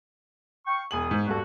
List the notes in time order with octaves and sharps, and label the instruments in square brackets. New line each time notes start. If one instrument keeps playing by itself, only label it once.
[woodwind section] F5 G5 C#6
[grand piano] E1 G#5 F#7 [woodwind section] D#6
[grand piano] G#2
[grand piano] D#1 G2 A4 [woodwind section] F#4